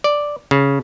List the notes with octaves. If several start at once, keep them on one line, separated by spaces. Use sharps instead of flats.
D5
C#3